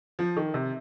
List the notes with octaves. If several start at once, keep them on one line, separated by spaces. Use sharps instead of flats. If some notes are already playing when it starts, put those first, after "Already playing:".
F3
D#3
C3